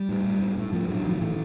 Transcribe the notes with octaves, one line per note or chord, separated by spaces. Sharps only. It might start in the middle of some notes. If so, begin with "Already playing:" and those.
Already playing: G3
A2
A2
A2
A2
A2 F3
A2 F#3
A2 D#3
A2 E3